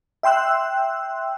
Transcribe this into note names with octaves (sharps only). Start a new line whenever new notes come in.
E5 G5 C6 E6 F#6